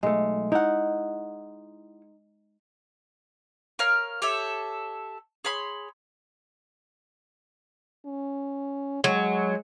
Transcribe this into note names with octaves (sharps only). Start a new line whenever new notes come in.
B1 G#3 A3
D#4 E4 F#5
A#4 C#5 F5
G4 A4 C#5 E5
G#4 C#5 B5 C6
C#4
F#3 G#3